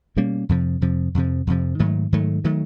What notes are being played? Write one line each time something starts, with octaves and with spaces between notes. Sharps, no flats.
B2 G3 A#3 C#4
F2 C3 F3
F2 C3 F3
F2 C3 F3
F2 C3 F3
G#2 D#3 F#3 A3
G#2 D#3 F#3 A3
D#3 F#3 A3